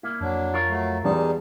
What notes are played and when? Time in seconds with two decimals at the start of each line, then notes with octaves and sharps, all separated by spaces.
0.03 C2 A#3 E4
0.21 F2 F#3 D4
0.54 F4 A#4 C#5
0.70 F#3 A3
1.04 E2 G3 D#4 G#4 A5